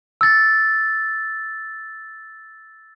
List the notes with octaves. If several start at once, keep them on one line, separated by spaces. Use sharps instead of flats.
E6 A6